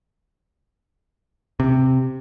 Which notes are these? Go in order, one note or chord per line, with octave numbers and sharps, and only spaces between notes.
C3